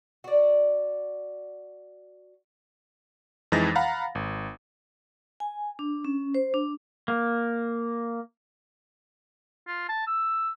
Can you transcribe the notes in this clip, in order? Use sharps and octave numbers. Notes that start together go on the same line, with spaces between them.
F#4 D5
F2 E3 G#3 D#4 A6 A#6
F5 F#5 A#5 B5
G#1
G#5
D4
C#4
C5
D4
A#3
F4
A5
E6